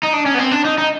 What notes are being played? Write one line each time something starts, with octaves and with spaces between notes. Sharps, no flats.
D#4
D4
C#4
B3
C4
D4
D#4
D#4